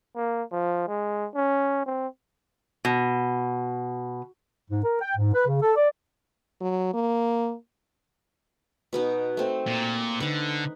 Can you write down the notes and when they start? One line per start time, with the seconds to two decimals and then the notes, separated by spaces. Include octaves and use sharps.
0.16 A#3
0.52 F3
0.88 G#3
1.35 C#4
1.86 C4
2.85 B2
4.71 G#2
4.84 A#4
5.01 G5
5.17 G#2
5.33 B4
5.47 C#3
5.62 A4
5.76 D5
6.61 F#3
6.94 A#3
8.93 B2 B3 D#4
9.37 A3 C4
9.66 A#2
10.20 D3 D#4 B4